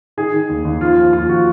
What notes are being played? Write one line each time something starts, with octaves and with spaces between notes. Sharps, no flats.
D#3 G#4
D#3
D#2
D#2
F3 F4
F3
D#2 F4
F3 F#4